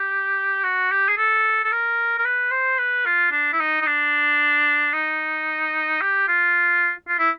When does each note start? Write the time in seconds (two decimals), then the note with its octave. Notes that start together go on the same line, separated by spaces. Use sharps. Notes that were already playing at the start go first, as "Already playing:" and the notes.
Already playing: G4
0.64 F#4
0.91 G4
1.09 G#4
1.18 A4
1.64 A4
1.72 A#4
2.19 A#4
2.25 B4
2.51 C5
2.79 B4
3.06 F4
3.32 D4
3.53 E4
3.60 D#4
3.82 D#4
3.86 D4
4.93 D#4
6.01 G4
6.28 F4
7.08 F4
7.19 E4